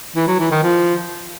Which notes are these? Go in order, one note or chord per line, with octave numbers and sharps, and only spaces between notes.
E3
F#3
E3
D#3
F3